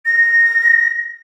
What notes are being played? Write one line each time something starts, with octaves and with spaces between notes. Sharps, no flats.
A#6